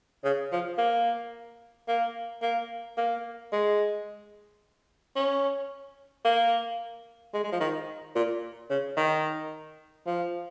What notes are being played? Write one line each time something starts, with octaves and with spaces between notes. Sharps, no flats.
C#3
F3
A#3
A#3
A#3
A#3
G#3
C#4
A#3
G#3
G#3
F3
D#3
A#2
C#3
D#3
F3